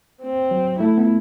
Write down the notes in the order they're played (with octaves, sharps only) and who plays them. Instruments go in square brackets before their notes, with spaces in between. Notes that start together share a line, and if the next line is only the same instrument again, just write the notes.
[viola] C4
[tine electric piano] F#3
[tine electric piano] A3 [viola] E4
[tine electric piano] B3